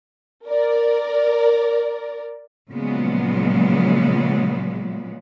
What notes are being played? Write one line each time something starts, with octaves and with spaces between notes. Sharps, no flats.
A#4 D5
A#2 C#3 F3 F#3 G#3 B3